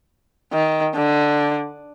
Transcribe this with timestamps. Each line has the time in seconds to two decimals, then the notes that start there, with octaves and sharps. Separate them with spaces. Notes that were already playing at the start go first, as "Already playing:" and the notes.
0.53 D#3
0.95 D3